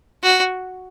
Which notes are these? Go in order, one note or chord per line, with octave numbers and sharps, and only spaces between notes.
F#4